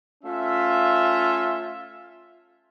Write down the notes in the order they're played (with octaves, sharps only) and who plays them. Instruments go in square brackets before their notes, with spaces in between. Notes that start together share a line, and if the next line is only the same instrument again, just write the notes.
[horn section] A3 C#4 F4 E5